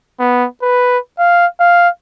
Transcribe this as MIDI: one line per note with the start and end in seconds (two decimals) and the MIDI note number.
0.20 0.46 59
0.62 0.98 71
1.19 1.46 77
1.60 1.89 77